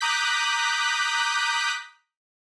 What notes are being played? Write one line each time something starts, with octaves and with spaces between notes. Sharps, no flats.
A#5 D6 D#6 F#6 G6 B6